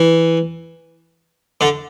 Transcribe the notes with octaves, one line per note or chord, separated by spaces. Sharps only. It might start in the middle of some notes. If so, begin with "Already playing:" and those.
Already playing: E3
D3